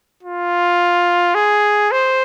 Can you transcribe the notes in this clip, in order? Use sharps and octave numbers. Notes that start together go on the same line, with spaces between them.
F4
G#4
C5